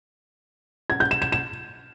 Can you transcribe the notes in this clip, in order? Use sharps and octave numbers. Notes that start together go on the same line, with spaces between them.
G#6
G6
E7
E7
E7